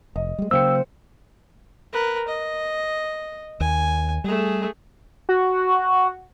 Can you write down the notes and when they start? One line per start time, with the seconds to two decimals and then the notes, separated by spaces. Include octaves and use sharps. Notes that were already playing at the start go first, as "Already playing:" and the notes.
0.16 F1 D#5
0.39 G3 G#3
0.51 C#3 F#3 A#3 C5 F5 G5 E6 C#7
1.93 A#4 B4
2.28 D#5
3.60 D#2 G#5
4.24 G3 A3 G#4
5.29 F#4